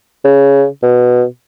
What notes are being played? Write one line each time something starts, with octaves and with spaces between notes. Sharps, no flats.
C#3
B2